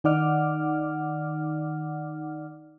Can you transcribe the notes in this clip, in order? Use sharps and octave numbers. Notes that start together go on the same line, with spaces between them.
D#3 D#4 D5 F#5 D6 F6